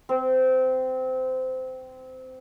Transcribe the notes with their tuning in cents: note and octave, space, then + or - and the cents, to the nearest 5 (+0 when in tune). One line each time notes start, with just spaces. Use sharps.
C4 -20